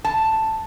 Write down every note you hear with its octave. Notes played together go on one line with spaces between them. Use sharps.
A5